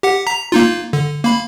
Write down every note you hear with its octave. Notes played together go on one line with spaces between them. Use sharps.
G4 F#5
A#5 B6
A#3 D#4 F4
D3
A#3 B5